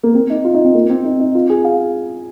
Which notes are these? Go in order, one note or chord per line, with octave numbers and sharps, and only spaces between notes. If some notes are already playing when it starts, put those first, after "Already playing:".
A#3
C4
D#4
F4
D#4
C4
A#3
C4
D#4
D#4
F4
G#4
F5